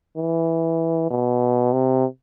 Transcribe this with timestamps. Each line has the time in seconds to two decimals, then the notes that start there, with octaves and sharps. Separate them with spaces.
0.17 E3
1.10 B2
1.72 C3